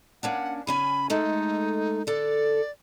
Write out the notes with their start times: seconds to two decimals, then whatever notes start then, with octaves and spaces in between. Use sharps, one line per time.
0.23 A#3 C#4 D4 F#5
0.67 C#3 C#4 G#5 B5
1.10 G#3 A3 D#4 A4
2.07 D3 A4 D5